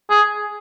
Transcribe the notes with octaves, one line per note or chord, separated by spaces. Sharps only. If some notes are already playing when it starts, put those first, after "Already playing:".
G#4